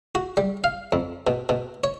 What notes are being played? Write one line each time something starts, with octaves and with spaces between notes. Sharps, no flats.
F#4
G3
F5
F2
B2
B2
C#5